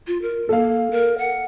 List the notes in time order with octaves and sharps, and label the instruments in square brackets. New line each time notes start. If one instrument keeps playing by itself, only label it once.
[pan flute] F4
A#4
[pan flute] A#3 [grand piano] A4 F5
[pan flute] A#4
F#5